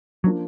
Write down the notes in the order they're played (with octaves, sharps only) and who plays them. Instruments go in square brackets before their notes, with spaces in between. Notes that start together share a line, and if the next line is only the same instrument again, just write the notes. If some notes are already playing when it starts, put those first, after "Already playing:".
[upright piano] F3 A#3 D4 [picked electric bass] F#3